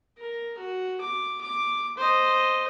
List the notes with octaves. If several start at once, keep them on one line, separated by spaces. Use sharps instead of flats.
A#4
F#4
D6
D6
C5 D#5